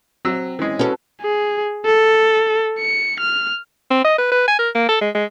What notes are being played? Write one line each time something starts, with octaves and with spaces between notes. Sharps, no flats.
F#3 C4 E6
E3 G#3 C#4 G#4
C#4 F#4 A4 B4
G#4
A4
C#7
F6
C4
D#5
B4
B4
G#5
A#4
A#3
A4
G#3
G#3